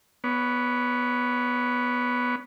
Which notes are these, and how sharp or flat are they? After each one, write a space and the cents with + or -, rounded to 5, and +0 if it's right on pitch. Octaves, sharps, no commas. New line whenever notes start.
B3 -5 C#5 +30